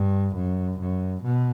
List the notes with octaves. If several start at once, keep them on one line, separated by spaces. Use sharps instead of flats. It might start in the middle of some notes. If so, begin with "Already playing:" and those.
Already playing: G2
F#2
F#2
B2